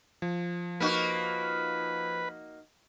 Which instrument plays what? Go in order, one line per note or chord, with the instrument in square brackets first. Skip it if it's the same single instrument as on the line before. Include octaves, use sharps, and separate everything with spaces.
[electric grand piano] F3
[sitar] A#3 D#4 F#4 [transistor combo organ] B4